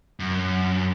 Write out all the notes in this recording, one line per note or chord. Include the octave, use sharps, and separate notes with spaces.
F#2